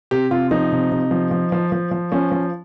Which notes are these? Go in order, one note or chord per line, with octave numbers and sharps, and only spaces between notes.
C3 G4
C3 F4
F3 D#4
C3
C3
F3
F3
F3
F3
F3
F3 C#4
F3